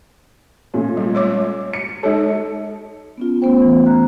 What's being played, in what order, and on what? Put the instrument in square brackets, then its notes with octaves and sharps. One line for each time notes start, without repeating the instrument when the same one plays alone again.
[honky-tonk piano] A#2 A3 C#4
[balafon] G3
G#3 C#5 D6
[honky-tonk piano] C#7
[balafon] G#3 C#5 [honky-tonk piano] D#4 A4
[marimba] B3 C#4 F4
A3 B3 C#4 C5 G5
E3
D2 A#5 F#6